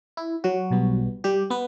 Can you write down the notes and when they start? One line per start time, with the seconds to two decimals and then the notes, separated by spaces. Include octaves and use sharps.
0.17 E4
0.44 F#3 F#4
0.70 B1 B2 G3 B3
1.24 G3 G4
1.50 B3 B4